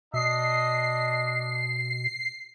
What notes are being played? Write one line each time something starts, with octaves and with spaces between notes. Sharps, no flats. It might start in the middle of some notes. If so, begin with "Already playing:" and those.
B2 D4 D#5 C7